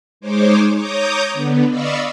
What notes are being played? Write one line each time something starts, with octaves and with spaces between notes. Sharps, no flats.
G#3 D#4 C5 C#5 D6
C#5 A#5 D6 D#6 G6
D3 B3
D5 D#5 F5 B5 C#6 E6